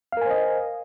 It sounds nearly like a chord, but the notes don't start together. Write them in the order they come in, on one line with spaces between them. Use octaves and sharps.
F5 A#4 G#5 C5 D#5